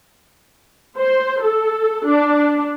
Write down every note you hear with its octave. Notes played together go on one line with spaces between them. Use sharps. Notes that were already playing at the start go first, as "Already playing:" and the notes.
C5
A4
D4